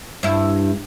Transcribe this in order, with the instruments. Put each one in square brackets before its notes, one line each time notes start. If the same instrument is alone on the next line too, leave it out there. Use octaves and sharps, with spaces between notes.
[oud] G2 E4